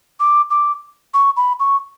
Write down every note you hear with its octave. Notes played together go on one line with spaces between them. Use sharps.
D6
D6
C#6
B5
C#6